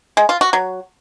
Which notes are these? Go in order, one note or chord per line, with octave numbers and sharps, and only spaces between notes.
G#3
F4
F#4
F#3